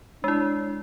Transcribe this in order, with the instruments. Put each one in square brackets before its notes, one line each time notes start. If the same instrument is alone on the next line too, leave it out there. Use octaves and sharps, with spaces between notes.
[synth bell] G#3 E4 [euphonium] D4